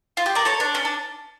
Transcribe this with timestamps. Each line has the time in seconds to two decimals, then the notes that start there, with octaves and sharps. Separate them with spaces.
0.17 F4
0.26 G4
0.35 A#4 D5
0.45 A4 C#5
0.60 D4
0.75 C#4
0.85 D4